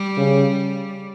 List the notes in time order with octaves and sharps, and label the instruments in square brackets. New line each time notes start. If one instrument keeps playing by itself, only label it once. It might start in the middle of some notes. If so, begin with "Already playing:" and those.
Already playing: [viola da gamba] G3
[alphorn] C#3